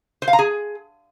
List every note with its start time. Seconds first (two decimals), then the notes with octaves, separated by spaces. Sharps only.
0.22 C5
0.28 F5
0.33 A#5
0.39 G#4